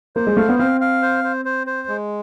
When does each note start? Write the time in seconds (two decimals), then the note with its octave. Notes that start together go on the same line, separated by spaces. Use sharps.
0.16 A#3 C5
0.27 G#3
0.37 A3 F5
0.49 B3
0.59 C4 F5
0.81 F5
1.02 C5
1.24 C5
1.45 C5
1.67 C5
1.88 G#3